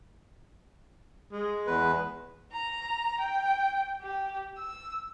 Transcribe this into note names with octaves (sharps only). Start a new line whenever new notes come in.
G#3
E2 B4
A#5
G5
G4
E6